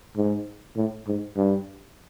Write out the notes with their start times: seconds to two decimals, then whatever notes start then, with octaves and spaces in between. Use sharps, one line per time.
0.17 G#2
0.76 A2
1.07 G#2
1.37 G2